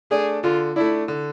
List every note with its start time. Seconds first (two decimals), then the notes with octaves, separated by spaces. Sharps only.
0.11 A3 D4 G#4
0.44 D3 F4
0.76 A3 D4 E4
1.08 D3